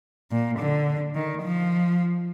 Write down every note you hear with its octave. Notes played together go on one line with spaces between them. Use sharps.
A#2
D3
D#3
F3